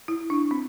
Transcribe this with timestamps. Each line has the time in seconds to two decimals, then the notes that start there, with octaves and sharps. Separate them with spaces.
0.08 E4
0.30 D4
0.51 C4